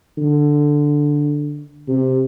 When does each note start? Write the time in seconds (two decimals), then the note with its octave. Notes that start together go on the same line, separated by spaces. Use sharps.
0.18 D3
1.88 C3